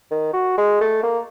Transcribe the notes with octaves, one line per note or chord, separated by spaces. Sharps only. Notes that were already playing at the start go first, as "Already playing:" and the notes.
D#3
F#4
G#3
A3
A#3